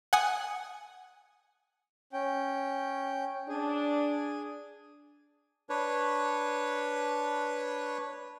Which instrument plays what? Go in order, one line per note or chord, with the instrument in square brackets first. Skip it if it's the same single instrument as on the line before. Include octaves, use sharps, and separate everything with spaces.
[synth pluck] F#5 G#5 D#6
[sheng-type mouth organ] C#4 G5
[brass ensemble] D4 [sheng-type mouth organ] G#4
[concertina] D4 B4 C#5